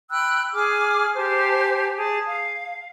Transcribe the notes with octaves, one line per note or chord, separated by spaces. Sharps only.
G5 B5 E6 F#6
G#4 G#5 D6 F6
G4 C5 G#5 A5
G#4 A5
F5